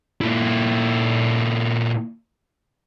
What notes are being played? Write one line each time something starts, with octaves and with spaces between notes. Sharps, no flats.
A#2 E4